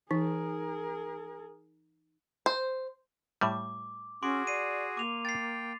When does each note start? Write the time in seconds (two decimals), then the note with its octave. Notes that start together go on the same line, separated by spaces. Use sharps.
0.11 E3 D#4 G#4 A#4
2.46 C5
3.41 A2 G3 D6
4.23 C#4 F#4 G#4 C6 D6 D7
4.47 D5 C7 D#7
4.97 A#3 D6 F7
5.25 G5 A6 C7